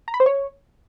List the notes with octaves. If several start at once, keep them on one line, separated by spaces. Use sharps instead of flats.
A#5
B5
C5
C#5